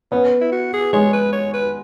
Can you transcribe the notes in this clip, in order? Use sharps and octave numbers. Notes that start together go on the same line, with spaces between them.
B3 C#4
E4
F#4
G#4
G#3 C#5
B4
C#5
B4